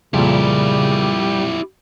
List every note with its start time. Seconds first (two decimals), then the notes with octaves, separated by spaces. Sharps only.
0.14 F2 A#2 C#3 G3 E4 G4